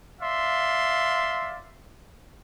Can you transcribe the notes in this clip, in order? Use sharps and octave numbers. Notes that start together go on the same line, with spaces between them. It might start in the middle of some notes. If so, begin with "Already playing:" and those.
D5 E5 F5 C6